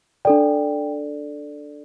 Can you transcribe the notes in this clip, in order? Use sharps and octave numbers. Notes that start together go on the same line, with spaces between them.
D4 A4 D5 G5